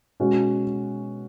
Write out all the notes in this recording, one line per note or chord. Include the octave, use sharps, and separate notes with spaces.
B2 G#3 C#4 F#4